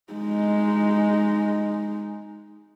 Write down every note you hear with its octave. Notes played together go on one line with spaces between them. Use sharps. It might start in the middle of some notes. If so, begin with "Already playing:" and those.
G#3 D#4